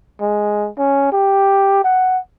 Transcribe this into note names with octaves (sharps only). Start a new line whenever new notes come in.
G#3
C#4
G4
F#5